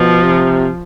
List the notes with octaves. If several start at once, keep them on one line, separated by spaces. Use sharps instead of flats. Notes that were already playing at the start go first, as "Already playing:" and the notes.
Already playing: B2 F3
C3